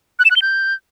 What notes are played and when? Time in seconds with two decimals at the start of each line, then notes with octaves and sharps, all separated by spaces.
0.19 F#6
0.25 E7
0.31 F#6
0.36 G7
0.42 G6